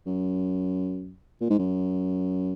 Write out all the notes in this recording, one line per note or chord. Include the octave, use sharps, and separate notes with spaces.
F#2
A#2
G#2
F#2